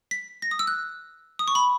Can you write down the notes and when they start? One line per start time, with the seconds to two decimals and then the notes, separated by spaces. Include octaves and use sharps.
0.11 B6
0.42 A#6
0.51 D#6
0.59 E6
0.67 F#6
1.39 D#6
1.48 C#6
1.55 B5